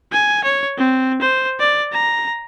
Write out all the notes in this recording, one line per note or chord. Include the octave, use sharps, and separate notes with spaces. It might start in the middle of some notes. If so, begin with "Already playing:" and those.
G#5
C#5
C4
C5
D5
A#5